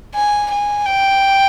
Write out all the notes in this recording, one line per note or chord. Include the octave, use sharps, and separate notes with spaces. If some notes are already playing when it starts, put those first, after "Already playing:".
G#5
G#5
G5